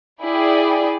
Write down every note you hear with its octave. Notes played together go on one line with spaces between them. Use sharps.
E4 G#4 D5 G5